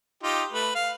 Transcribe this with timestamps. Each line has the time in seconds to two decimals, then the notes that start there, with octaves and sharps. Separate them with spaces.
0.23 D#4 F4 G4
0.52 A3 B4
0.75 F5